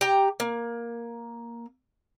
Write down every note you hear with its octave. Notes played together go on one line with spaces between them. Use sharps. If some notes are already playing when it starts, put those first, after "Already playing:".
G4 A#5
A#3